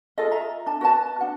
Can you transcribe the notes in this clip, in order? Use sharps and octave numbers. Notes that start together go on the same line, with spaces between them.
F4 G#4 A4 D#5
F4 E5 A#5
D4 A5
F#4 B4 D#5 A5
D4 F#5